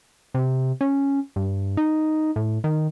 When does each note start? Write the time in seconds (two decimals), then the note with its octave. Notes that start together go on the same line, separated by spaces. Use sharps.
0.34 C3
0.81 C#4
1.36 G2
1.77 D#4
2.36 A2
2.64 D#3